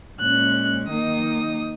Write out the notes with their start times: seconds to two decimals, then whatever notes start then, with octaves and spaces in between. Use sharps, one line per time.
0.19 A#2 G#3 C#4 F#6
0.89 D#3 A#3 D#4 D#6